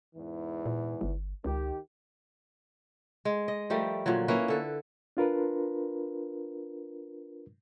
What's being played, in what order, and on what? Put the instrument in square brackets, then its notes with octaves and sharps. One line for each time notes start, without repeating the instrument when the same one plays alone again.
[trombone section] E2 G#2 E3
[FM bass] A#2
G1
[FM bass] C#2 [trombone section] D#3 G4
[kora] G#3
D#5
F3 G3 A3 A#4
A#2 D3 F3 F#3
A#3 C#4 E4 B4
D3 A4
[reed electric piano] D4 F4 A#4 B4